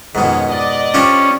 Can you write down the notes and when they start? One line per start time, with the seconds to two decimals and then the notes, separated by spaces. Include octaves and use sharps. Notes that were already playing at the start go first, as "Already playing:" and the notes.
0.15 F2 G#2 B2 D#3 C#4
0.50 D5 D#5
0.94 F3 C#4 D4 G4